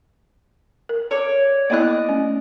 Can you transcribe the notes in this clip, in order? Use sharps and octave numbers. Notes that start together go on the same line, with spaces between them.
A#4
C#5 D5
A#3 B3 E4 D5 D#5 F#6
A3 C#4